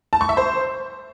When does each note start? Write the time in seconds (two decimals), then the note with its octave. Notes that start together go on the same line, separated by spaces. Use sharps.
0.13 A5
0.21 C#6
0.29 E5
0.37 C5